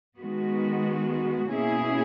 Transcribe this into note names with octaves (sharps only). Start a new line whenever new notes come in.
D#3 G#3 B3 F#4
B2 A#3 C#4 E4 G#4